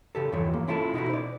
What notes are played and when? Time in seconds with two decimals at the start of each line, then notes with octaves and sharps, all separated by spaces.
0.15 C#3 G4 A4
0.32 E2 G2 E3 F3 C#5
0.53 A#3
0.68 C#4 E4 F4 A4 A5
0.94 B2 D#4 E4 F#4
1.09 C5 D5